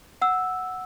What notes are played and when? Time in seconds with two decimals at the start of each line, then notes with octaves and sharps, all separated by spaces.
0.22 F#5 E6